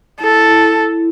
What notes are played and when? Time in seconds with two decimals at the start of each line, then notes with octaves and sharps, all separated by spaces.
0.20 E4 A4
0.48 E4
0.75 E4